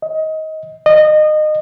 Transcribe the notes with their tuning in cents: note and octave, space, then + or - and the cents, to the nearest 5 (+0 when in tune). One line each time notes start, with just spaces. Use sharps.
D#5 +20
D#5 -25